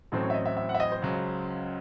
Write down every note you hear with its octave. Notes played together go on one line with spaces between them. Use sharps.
A1 A2 F#3 C4 A4
C#5
E5
D#5
E5
E5
F#5
E5
D#5
C5
C#2 C#3 F#3